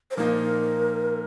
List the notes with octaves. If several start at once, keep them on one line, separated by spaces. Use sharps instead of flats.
C5
A#2 F3 A#3 D#4 A#4